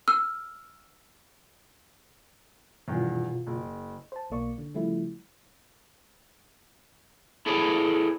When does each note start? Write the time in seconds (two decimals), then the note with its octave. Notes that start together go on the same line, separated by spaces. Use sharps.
0.08 E6 F6
2.88 E2 G2 B2 D#3 F4
3.47 F#1
4.12 C5 A5
4.30 B1 B2 A#3 D5 C#6
4.58 D3
4.74 C#3 F3 G3 A3 E4
7.46 E4 G#4 A4 B4 C5 D5